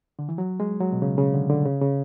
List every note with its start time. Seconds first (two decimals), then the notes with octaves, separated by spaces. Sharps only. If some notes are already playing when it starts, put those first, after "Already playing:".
0.19 D3
0.29 E3
0.38 F#3
0.60 G#3
0.80 F#3
0.92 B2
1.02 C#3
1.18 C#3
1.34 D3
1.50 D3
1.65 C#3
1.81 C#3